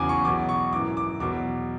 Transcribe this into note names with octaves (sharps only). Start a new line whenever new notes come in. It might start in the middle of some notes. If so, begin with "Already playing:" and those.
Already playing: E2 C#3 F#3 G#5 D6
C#6
E2 B2 F#3 D6
C#6
G#1 F#2 E3 D6
D6
E2 B2 F#3 D6